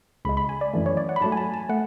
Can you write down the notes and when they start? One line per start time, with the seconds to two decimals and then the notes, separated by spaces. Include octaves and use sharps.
0.25 C#2 C#3 G#3 B5
0.37 B5
0.49 G#5
0.61 D5
0.74 F#2 E3 A3
0.86 C#5
0.97 D5
1.09 F#5
1.16 B5
1.21 G#2 F#3 A3 A5
1.32 G#5
1.37 A5
1.54 A5
1.69 A3 F#5